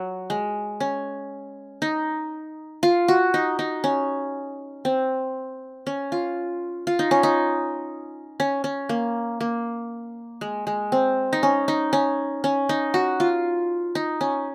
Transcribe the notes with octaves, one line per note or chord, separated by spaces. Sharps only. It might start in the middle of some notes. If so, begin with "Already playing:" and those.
Already playing: F#3
G#3
C#4
D#4
F4
F#4
D#4
D#4
C#4
C4
C#4
F4
F4
D#4
C#4
D#4
C#4
C#4
A#3
A#3
G#3
G#3
C4
D#4
C#4
D#4
C#4
C#4
D#4
F#4
F4
D#4
C#4